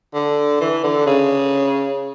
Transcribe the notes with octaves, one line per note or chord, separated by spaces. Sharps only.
D3
E3
D3
C#3